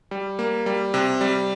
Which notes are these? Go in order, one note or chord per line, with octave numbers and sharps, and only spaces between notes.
G3
A#3
G3
C3
G3